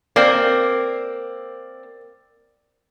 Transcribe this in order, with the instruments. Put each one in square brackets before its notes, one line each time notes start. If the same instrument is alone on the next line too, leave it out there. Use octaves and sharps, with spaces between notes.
[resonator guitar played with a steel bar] A#3 C4 [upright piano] D5